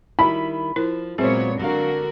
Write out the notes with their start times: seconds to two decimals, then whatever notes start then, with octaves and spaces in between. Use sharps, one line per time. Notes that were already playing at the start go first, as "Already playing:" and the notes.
0.19 D#3 G3 E4 B5
0.76 F3 E4 A#4
1.18 A#2 F#3 G#3 B3 C4 G#4 C5 C#5
1.59 D3 F#3 F#4 A#4 F5